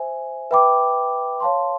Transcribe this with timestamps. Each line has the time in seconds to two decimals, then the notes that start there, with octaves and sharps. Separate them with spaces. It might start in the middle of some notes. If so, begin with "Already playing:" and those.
Already playing: C5 E5 G#5
0.51 B4 E5 G5 B5 D6
1.40 C#5 F5 A5 C6